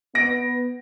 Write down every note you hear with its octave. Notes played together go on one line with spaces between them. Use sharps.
B3 A#6 D7